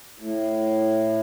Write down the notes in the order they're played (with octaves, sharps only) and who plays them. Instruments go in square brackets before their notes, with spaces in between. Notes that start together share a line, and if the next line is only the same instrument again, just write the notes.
[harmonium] A2